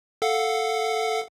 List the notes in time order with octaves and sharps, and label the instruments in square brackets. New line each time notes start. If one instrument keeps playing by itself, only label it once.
[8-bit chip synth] A4 F5 F#5